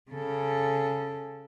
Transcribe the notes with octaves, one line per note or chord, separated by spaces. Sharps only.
C#3 A4